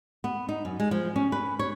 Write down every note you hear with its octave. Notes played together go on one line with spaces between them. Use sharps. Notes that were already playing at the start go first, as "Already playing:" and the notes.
B3
D#4
F#2
G#3
F3
C#4
B4
C#5